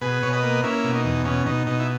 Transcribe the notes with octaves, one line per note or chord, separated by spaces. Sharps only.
B2 G#4 B4
B2 C#5
B4 D#5
A#3
A#3 C#4 E4
B2
D#4
E2
B2 C#4
B2 D#4
B2 D#4
E4